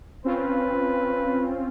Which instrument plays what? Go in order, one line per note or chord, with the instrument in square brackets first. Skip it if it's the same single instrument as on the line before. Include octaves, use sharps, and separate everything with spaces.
[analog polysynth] C4 C#4 F4 [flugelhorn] B4